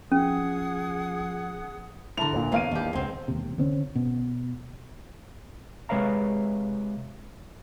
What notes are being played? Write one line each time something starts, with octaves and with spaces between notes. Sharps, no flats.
F3 C#4 G#4 F#5 D#6
D3 E4 A#4 A5 F7
D1 A#2
E2 B2 A#3 C#4 F5 D#7
D#2 D4 G4
E1 C#2 G#3 C4
E1 D#2 C3
D3 C4 C#4
B2
C3 G#3 B4 C#5 F5 A#5